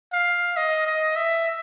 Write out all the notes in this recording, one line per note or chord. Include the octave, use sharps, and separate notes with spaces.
F5
D#5
D#5
E5